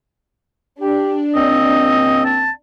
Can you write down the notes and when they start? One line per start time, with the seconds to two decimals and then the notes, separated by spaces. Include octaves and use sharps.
0.81 D4 G4
1.35 C#2 A#3 C4 D#5
2.25 A5